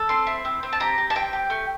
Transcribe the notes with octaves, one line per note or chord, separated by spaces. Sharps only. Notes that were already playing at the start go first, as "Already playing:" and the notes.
Already playing: A4
C4 C6
E4
C4
C4
A5
G4 A#5
G4
A5
C4 G5
G4
A3